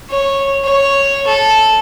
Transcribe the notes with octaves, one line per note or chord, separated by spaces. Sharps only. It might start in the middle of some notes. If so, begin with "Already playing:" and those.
C#5
C#5
A4